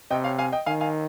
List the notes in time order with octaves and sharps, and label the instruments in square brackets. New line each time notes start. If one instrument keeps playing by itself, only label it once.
[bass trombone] C3 [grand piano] D#5 G5
[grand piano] C#5 F5
F5 G#5
D#5 G5
[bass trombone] D#3 [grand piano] F5 G#5
[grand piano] F5 G#5